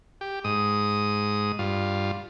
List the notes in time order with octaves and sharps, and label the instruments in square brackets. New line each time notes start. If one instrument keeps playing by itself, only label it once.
[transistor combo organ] G4
G#2 D#6
G2 F4